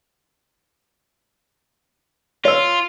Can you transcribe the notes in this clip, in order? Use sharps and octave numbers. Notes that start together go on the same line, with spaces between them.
F4 C#5 E6